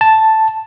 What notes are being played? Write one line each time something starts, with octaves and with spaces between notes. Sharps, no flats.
A5